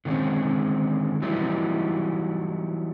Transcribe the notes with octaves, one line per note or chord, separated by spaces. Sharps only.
D3 D#3 G#3 C4 C#4
E3 F#3 G3 B3 D#4 E4